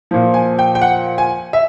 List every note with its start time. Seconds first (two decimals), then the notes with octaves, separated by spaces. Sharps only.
0.11 A#2 F3
0.34 G#5
0.59 G5
0.75 G5
0.81 F#5
1.18 G#5
1.53 E5